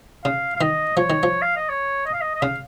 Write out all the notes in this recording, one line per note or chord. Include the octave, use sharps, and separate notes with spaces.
C#3 F5
F5
D#3 D#5
F3 C#5
D#3
F3
F5
D#5
C#5
D#5
F5
D#5
D#5
C#3 F5